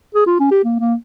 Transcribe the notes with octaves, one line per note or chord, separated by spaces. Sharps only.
G#4
F4
C#4
G4
A#3
A#3